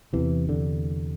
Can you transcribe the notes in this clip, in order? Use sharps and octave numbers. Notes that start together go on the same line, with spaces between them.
E2 C3 E3
D3